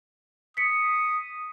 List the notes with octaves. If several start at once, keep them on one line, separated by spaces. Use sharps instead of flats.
D#6 B6 C#7